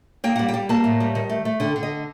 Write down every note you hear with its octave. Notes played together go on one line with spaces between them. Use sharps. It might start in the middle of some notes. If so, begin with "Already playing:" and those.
A#3 G5
G3 F#5
G5
G3
A#3 A5
A2
G3
D#3
A3
A3
D3 G5
D3
D#5